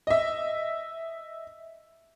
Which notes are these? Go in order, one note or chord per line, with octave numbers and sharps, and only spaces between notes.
D#5 E5